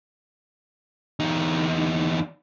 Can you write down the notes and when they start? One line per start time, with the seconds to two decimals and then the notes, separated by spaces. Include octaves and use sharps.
1.20 E2 D#4